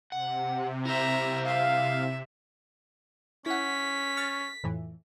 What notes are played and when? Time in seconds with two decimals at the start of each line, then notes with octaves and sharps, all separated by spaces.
0.12 C3 F#5
0.85 E4 C5 E5 A#5
1.46 E5 F5
3.46 C#4 E4 F#5 B6
4.17 C#6 F6 A6
4.64 F2 A2 E3